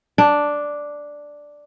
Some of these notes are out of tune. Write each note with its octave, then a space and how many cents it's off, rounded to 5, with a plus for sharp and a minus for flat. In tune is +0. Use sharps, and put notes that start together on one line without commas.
D4 +0